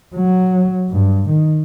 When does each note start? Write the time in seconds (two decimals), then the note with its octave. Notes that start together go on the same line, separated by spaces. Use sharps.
0.15 F#3
0.90 G2
1.29 D#3